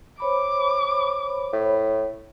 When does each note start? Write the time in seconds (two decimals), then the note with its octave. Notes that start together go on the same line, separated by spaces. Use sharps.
0.20 C5 C#5 B5 D6
1.53 A2